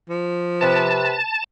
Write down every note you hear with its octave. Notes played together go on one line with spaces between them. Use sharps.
F3
C3 B4 A5